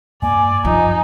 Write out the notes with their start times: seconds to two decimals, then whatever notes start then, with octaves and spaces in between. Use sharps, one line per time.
0.22 G2 A#3 D5 G#5
0.65 F#2 F3 D#4